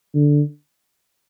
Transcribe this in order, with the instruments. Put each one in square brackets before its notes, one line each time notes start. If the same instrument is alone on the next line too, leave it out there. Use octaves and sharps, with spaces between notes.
[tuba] D3